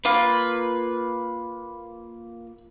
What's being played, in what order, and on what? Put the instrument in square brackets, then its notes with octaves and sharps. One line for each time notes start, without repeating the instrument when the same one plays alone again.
[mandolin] A#3 F4 [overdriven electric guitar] B4